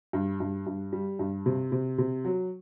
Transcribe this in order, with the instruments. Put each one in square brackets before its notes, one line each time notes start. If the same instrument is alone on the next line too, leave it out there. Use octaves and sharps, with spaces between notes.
[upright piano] G2
G2
G2
G3
G2
C3
C3
C3
F#3